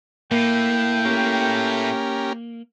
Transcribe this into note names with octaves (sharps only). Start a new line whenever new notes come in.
A2 A#3 G5
C#4 G4 A#4